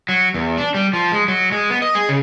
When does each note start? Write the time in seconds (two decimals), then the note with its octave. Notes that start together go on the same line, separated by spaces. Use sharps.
0.09 F#3
0.34 E2
0.58 D4
0.74 G3
0.93 F3
1.12 G#3
1.28 F#3
1.52 G#3
1.70 B3
1.82 D#5
1.95 G#4
2.09 C#3